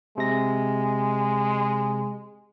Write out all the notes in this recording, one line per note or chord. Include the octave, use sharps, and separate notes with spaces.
C3 G#3 A#6